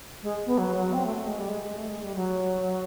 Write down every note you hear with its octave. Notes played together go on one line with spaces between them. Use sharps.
G#3
B3
F#3
F#3
C4
A3
A3
G#3
G3
G#3
G#3
A3
G#3
G3
F#3